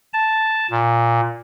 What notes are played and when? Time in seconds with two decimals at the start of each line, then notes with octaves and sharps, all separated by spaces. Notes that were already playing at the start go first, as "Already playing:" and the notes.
0.14 A5
0.71 A#2